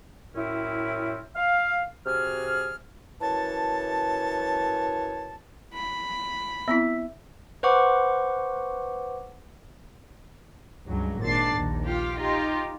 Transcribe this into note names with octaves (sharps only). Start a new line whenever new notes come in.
F#2 A2 C4 C#4 E4
F5
C3 F#4 G#4 F6
F#2 E3 C#5 A5
B5
B3 C4 E4 E5 E6 B6
B4 C5 F#5 C#6 D6
C#2 G2 F#3
G#1 A#2 D4 A6 C7
A#1 D#2
F4 G4 F5
D#4 F4 G4